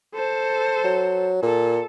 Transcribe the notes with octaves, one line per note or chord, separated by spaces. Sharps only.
A4 C5
F#3
A#2 A4